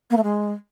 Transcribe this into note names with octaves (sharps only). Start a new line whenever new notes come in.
A#3
A3
G#3